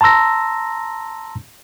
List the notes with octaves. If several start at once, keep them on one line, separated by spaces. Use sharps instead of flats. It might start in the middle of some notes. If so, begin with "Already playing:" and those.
A5 A#5 C6 E6 A#6